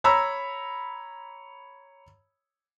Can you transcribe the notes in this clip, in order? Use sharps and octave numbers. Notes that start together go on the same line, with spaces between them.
C#5 A#5 B5 E6